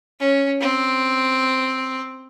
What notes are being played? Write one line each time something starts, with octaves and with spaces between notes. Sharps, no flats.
C#4
C4